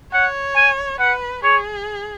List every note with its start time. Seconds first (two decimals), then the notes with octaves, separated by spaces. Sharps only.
0.12 C#5 F#5
0.56 G#5
0.99 B4 F#5
1.43 G#4 C#5